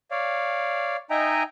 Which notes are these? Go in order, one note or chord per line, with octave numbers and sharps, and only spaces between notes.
C#5 D5 F5
D#4 D#5 E5 G5 G#5 A#5